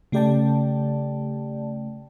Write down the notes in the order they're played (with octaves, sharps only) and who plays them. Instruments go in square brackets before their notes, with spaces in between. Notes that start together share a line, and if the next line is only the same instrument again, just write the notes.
[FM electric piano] C#3 A3 G4 D5 G5 A5